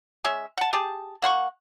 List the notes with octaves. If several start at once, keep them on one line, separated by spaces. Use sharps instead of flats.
G#3 C#4 E5
F#5 A5
G4 G#4 A5
A#3 F#5 C6 C#6